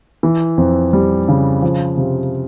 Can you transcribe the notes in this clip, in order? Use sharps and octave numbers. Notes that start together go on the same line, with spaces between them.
E3
F2
G3
C#3
F3
C3